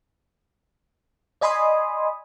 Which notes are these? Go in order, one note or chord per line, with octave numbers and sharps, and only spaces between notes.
D5 D#5 G#5 B5 C6 D#6